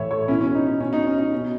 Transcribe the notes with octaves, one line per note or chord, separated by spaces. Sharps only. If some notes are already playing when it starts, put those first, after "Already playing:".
Already playing: A2 E3 C#5 E5
A4 C#5
B2 C#4 E4
C#4
D#4
C#4
B2 C#4
D#4
C#4
D#4
B2